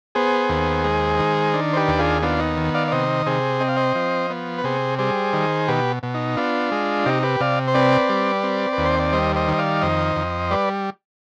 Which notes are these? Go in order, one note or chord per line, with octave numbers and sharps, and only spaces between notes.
B3 G#4 C5
D#2
G#3
D#3
D4
C5
G4 B4
D#2
F4 G#4
B3 D4 F4
D#4
D#3
D5 F5
D5
C3 C5 D#5
C3 G#4 C5
C4 D#5
F5
C5 D#5
F3
B3
B4
C3 G#4 C5
G3 G#4 C5
D#3
B2 G4 B4
B2
D#4
B3 D4 F4
G#3
C3 D#4 G4
G4 B4
C3 D5 F5
C5
C4 B4 D5
G3
C4
B4
D#2
C5
D5
G3 C5 D#5
C5 D#5
D#3
D#5
D5 F5
F2 C5 D#5
F2
G3 B4 D5